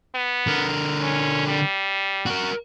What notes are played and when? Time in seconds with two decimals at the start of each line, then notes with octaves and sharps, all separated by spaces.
0.15 B3
0.47 D3 A#4
1.01 C#4
1.48 G3
2.26 F#4 A#4